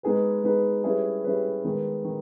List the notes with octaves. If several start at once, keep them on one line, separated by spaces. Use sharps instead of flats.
G#3 B3 D#4 G#4 B4
G#3 B3 D#4 G#4 B4
G3 C#4 E4 G#4 B4
G3 C#4 E4 G#4 B4
D#3 G#3 B3
D#3